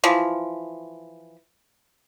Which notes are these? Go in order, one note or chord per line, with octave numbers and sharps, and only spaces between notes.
E3 F3